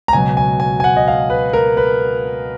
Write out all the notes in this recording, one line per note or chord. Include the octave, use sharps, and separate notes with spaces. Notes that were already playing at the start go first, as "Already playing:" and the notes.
A#5
C#2 B2 F#3 G#5
G#5
G#5
G#5
F#5
D#5
F5
B4
A#4
B4